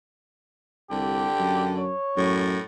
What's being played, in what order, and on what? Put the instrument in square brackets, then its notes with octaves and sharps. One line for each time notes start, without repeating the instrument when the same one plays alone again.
[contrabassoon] C2 [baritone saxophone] D3 [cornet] G4
[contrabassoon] F#2
[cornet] C#5
[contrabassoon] F#2 [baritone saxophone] A2